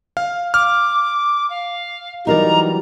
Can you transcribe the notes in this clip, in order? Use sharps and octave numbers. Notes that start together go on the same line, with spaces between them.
F5
D6 F6
F5
E3 F#3 G3 D#4 A#4 D5 A#5